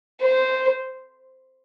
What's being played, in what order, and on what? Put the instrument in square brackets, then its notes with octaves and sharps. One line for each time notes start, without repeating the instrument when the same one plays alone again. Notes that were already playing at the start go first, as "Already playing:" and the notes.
[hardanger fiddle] C5